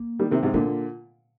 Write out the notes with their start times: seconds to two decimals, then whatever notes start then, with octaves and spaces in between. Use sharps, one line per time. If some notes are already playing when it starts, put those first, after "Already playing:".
Already playing: A#3
0.19 D#3 G3
0.31 C3 D#3
0.43 G#2 C3
0.54 A#2 D3 A#3